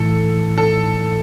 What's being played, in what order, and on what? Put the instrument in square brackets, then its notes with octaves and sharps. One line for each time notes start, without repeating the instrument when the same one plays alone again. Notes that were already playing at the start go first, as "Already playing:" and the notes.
Already playing: [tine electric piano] A2 E3 A3 E4 [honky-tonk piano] A4
[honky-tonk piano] A4